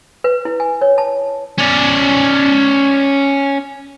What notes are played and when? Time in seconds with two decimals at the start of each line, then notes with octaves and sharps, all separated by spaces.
0.24 B4
0.45 E4
0.60 G#5
0.81 C#5
0.98 A5
1.58 C#4 D5